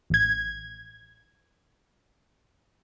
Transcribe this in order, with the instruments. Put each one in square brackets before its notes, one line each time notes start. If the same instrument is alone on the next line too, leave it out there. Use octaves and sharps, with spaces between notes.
[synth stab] A1 G#6